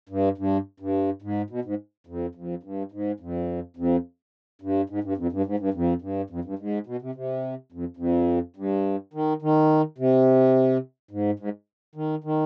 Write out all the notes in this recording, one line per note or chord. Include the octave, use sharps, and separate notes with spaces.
G2
G2
G2
G#2
B2
G#2
F2
F2
G2
G#2
F2
F2
G2
G#2
G2
F2
G2
G#2
G2
F2
G2
F2
G2
G#2
B2
C3
C3
F2
F2
G2
D#3
D#3
C3
G#2
G#2
D#3
D#3